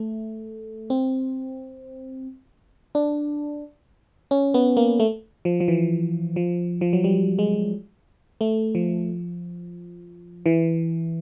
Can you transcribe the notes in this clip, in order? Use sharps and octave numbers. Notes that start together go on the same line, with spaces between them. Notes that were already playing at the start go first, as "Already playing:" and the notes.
Already playing: A3
C4
D4
C#4
B3
A#3
A3
F3
F3
E3
F3
F3
F#3
G3
G#3
A3
F3
E3